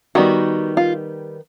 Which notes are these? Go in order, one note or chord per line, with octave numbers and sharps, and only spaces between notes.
D#3 G3 B3 D#4 F#4
F4